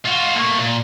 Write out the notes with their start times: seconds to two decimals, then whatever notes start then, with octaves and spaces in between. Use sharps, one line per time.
0.05 F4 F#4
0.36 A3 A#3
0.58 A#2